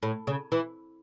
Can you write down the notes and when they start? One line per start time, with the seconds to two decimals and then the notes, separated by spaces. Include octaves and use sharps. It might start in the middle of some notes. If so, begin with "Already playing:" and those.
0.03 A2
0.27 C#3
0.52 E3